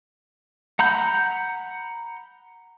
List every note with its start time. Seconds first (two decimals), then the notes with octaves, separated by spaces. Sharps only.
0.79 F#5 A#5 B5 G6